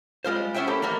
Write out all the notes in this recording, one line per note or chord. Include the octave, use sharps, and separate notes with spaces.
G3 G#3 F4 C5
B3 C#4 E4 C5 E5 G5
A3 A#3 C#4 E4 G4 A4
D#3 E3 A3 A#3